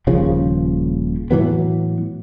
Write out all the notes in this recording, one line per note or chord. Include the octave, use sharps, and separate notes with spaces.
D#1 D#2 C#3 F3
A2 E3 F#3 B3